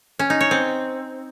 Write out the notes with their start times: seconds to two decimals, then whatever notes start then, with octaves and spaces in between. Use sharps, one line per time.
0.19 C#4
0.30 D#4
0.40 C#5
0.51 C4